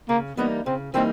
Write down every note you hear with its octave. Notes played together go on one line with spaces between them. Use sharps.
C#3 A#3
E3 G3 A#3 B3 D#4
C#3 C4
E3 G3 A#3 C4 D#4